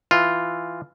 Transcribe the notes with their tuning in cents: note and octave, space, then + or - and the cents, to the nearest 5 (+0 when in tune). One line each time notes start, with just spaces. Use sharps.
E3 +5 F4 +0